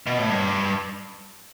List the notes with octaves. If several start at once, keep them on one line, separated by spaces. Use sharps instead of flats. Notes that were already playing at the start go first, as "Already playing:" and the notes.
B2
A2
G2